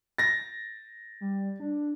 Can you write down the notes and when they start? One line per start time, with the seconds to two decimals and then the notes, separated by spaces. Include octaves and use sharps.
0.18 A6 A#6
1.21 G3
1.60 D4